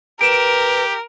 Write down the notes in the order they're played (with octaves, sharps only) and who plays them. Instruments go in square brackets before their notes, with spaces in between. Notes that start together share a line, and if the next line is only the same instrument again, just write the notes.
[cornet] G4 [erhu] A#4 [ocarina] B4 [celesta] D7 E7